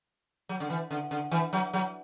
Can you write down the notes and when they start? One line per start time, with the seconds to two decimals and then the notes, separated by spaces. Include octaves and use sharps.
0.49 F#3
0.60 D3
0.70 E3
0.91 D3
1.11 D3
1.31 E3
1.53 F#3
1.73 F#3